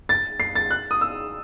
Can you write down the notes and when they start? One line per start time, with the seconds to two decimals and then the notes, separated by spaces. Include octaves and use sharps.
0.09 A6
0.40 C7
0.55 A6
0.71 F#6
0.91 D#6
1.01 E6